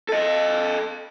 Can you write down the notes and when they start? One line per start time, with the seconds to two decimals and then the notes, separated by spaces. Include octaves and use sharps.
0.09 A4 D#5